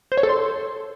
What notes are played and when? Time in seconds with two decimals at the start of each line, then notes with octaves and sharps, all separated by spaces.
0.12 C5
0.17 C#5
0.23 A4
0.29 C6